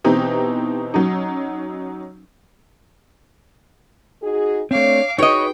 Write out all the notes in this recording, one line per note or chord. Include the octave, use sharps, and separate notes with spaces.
B2 E3 C4 D#4 G4
F#3 C#4 D#4
D#4 F#4 G#4
A3 C4 D4 C#5 F5 D6
D#4 F#4 G#4 B4 C#5 D#5 G5